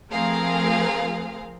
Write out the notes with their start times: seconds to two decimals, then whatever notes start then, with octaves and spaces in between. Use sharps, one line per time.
0.11 F3 A3 C4 G#4 A#4 F5